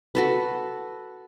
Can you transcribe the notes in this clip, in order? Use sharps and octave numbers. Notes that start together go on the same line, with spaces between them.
F#4 A4 B4